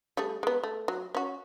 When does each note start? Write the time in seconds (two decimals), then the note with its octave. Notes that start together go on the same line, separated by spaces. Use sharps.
0.17 G3 A3 G#4
0.43 G#3 B3
0.63 A3
0.88 F#3
1.15 C#4 F#4